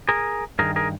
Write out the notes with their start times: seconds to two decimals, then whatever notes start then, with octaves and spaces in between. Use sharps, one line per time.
0.09 G#4 A#4
0.59 G2 D#3 G#4 A#4
0.76 G#4 A#4